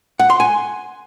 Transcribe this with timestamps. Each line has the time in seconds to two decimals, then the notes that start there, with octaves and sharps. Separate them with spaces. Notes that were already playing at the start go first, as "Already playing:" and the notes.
0.19 F#5
0.30 C6
0.40 G#5